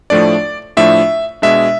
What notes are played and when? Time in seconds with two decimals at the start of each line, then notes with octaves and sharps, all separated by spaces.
0.10 A2 F3 A3 D4 D5
0.77 A2 F3 A3 D4 E5
1.42 B2 G#3 D4 E5